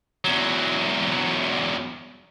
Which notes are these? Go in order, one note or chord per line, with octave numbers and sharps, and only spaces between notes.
E2 F#3